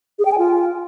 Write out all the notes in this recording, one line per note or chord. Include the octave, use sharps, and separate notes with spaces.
G#4
G5
G#5
F4